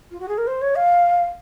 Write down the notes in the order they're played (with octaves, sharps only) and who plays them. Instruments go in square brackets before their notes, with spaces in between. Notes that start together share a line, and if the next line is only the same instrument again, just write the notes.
[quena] F4
F#4
G#4
A#4
C5
C#5
F5